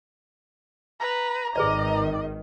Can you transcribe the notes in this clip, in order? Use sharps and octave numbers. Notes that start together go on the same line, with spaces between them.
B4 A#5
G#1 D#3 G#4 B4 D5 D#5